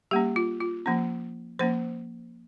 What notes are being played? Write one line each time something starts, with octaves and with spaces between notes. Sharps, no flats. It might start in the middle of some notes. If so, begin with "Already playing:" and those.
G3 A#3 C#4 G4
F4
F4
F3 A#3 C#4
F3 A#3 C#4 C5